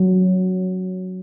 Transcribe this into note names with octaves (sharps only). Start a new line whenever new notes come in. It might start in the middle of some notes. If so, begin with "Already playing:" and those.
Already playing: F#3